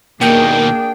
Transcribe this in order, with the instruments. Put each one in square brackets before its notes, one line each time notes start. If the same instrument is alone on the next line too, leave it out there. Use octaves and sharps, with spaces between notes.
[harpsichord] D#2 [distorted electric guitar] B2 D#3 [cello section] A#3 D4 G#4 [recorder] G5